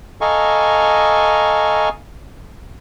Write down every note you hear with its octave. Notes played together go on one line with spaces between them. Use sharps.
A4 D#5 F5 G#5 A#5 C#6